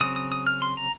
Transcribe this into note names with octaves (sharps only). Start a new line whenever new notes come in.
C#3 F#3 C4 D#6
D#6
D#6
F6
C6
A#5